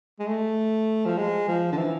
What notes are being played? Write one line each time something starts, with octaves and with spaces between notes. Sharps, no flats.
G#3
A3
F3
G#3
F3
D3
E3